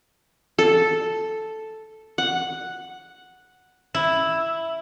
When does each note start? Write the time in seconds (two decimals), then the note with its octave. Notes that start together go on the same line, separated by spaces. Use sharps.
0.59 A4
2.18 F#5
3.94 E4